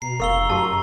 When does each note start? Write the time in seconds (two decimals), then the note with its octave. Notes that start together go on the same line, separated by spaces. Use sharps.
0.02 B2 A#5 C7
0.20 F1 A#4 F5 C#6 E6 G7
0.49 F#2 F#4 G4 A5